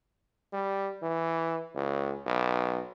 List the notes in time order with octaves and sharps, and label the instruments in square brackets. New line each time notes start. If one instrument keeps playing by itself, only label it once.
[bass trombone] G3
E3
C#2
B1